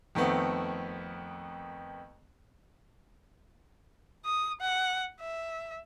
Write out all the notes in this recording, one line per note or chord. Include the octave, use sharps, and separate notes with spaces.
F2 D#3 A3 B3 C4
D#6
F#5
E5